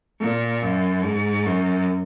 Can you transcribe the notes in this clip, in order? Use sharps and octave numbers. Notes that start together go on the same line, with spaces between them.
A#2
F#2
G#2
F#2